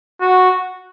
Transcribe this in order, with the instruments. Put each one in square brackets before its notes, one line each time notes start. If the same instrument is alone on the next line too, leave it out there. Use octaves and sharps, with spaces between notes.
[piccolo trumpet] F#4